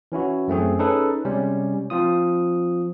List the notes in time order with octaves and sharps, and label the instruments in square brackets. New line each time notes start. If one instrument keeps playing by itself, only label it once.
[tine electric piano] E3 C#4 E4 F#4
F#2 A3 C4 G#4
C#4 D#4 G#4 A4 B4
C3 G3 G#3 C#4
F3 C4 F4 D#6